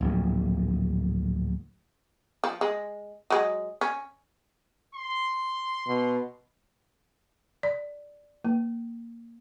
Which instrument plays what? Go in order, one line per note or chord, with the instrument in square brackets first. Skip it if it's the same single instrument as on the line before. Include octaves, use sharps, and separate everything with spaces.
[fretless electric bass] D1 A#1
[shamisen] F3
G#3
F#3 G#3
C#4
[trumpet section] C6
[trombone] B2
[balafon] D5
A#3